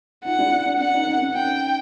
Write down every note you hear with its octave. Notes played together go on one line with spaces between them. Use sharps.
D#4 F4 F#5
D4 E4
D4
D4 F#5
C#4 D#4
C#4 D#4
C#4
C#4 D#4 G5